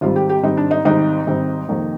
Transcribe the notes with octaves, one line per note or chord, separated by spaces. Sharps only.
G#1 G#2 G3 C4 F4
G4
G4
G#1 G#2 G3 C4 D#4
D4
D#4
G#1 G#2 G3 C4 D#4
G#1 G#2 G3 C4
F2 C3 D#3 A#3